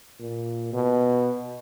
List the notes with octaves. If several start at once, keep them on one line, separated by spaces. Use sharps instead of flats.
A#2
B2